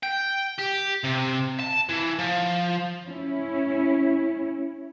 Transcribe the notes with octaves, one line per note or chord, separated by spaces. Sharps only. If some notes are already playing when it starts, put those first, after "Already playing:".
G5
G4
C3
A5
E3
F3
C#4 E4